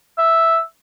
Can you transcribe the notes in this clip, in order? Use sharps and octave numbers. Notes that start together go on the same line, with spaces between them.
E5